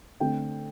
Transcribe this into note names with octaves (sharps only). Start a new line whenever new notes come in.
D3 A3 C4 G5